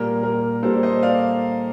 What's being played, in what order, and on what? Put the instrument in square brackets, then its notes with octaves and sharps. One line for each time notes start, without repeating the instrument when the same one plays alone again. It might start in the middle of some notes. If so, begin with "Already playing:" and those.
Already playing: [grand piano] A#2 G3 A#3 A#4
A#4
A#2 G3 A#3 A4 C5
C5 D#5
D5 F5